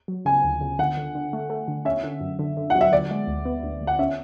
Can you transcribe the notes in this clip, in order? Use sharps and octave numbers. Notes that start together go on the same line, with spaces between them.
F#3
C#3 G#5
D2
C#3
D3 F#5
D3
D3
A3
A3
D3
C#4 E5
D3
F#2
D3
D3
F#3 F#5
E5
D3 D5
G#3
D2
B3
D2
D2
F#5
C#4 E5